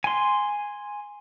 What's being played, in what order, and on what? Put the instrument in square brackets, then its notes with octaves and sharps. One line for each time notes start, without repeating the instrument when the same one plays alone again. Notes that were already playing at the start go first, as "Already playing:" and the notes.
[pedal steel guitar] G#5 C6